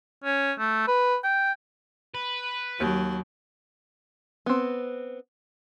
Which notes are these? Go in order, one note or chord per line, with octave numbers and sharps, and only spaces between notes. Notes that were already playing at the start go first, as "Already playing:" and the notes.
C#4
A3
B4
G5
B4
D#2 F#3
B3 C4